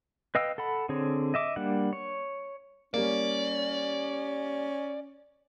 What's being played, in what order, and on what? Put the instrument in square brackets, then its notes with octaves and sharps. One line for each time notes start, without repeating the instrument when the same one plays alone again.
[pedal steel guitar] B4 D#5 F5 G5 E6
A4 F#5 B5
D3 C4 G#4 C#5
D#5 E5 D6
G3 A#3 D4 F#5
C#5
[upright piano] G3 A#3 [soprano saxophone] C#4 [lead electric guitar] D5